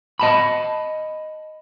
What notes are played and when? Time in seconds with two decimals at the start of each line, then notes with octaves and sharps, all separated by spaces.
0.20 D#5 A5 B5